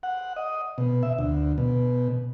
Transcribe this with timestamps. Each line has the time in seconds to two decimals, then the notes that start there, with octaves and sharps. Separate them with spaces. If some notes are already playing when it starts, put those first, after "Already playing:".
0.03 F#5
0.36 D#5
0.78 B2
1.03 E5
1.18 D2
1.58 B2